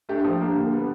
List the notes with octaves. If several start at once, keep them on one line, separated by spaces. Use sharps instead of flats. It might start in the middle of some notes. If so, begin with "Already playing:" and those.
A3 D4 G4
F3
A#3 D4 G4
D3
G3 B3